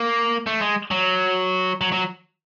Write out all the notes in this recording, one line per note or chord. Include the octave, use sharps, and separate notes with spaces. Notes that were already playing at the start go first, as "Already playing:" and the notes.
Already playing: A#3
A3
G#3
F#3
F#3
F#3